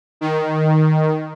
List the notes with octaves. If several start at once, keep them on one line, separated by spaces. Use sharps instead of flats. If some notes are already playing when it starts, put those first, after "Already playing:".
D#3